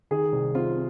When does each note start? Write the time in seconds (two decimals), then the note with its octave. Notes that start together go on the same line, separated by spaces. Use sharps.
0.11 D#3 G#4
0.32 C2
0.55 C3 F4